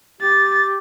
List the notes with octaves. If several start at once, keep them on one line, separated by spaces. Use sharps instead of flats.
G4 A6